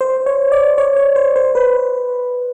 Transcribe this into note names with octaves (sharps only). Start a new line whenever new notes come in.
C5
C#5
D5
C#5
C#5
C5
C5
B4